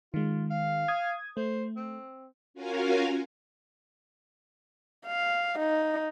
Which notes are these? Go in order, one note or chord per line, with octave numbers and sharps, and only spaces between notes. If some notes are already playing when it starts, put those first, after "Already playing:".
D#3 G#3 F4
F5
D#6 G#6
A3 C5
C4
C#4 F4 F#4 A#4 F5 G#5
F5
D#4